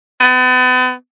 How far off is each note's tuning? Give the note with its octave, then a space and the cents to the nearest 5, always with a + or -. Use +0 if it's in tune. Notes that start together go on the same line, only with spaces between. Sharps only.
B3 +40